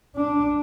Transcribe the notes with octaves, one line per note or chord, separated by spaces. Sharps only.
D4